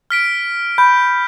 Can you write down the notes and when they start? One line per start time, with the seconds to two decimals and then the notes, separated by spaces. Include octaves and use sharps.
0.10 F6 B6 D7
0.78 B5 G6